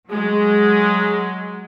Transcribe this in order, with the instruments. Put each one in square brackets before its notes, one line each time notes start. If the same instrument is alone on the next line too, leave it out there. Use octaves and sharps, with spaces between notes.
[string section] F#3 G#3